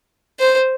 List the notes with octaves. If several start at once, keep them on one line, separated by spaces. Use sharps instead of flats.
C5